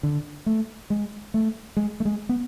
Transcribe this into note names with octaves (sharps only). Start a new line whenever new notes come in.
D3
A3
G#3
A3
G#3
A3
G#3
B3